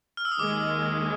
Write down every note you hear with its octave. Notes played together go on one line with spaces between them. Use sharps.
F6
E6
D#6
D#2 D#3 G#3 D6